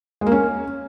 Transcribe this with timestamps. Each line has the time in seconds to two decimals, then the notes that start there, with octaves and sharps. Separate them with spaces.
0.21 G#3
0.27 A#3
0.32 C#4